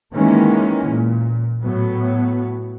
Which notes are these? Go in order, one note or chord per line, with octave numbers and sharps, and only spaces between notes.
D#3 E3 G#3 A#3 C#4
A#2
A2 F#3 B3